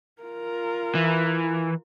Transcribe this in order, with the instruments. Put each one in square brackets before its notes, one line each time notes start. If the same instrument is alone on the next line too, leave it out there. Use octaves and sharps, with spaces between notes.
[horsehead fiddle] F4 A#4
[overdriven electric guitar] E3